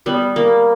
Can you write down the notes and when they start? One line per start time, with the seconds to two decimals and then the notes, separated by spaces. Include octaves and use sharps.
0.06 G3 B3
0.36 A#3